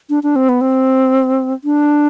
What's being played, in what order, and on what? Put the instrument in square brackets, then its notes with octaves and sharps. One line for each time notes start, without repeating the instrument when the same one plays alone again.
[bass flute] D4
D4
C4
B3
C4
D4